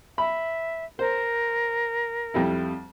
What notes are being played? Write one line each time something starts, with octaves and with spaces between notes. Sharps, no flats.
E5 B5
A#4 C5
F2 G3 E4